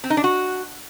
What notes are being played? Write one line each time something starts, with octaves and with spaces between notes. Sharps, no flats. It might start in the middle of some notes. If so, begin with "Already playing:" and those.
C4
D#4
D4
F#4